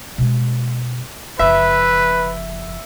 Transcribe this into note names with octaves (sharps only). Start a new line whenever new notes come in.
B2 G#3
F#1 F3 B4 E5